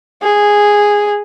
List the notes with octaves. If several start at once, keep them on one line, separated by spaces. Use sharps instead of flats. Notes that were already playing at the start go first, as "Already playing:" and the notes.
G#4